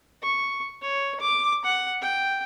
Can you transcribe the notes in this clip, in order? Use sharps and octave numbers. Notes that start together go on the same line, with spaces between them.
C#6
C#5
D6
F#5
G5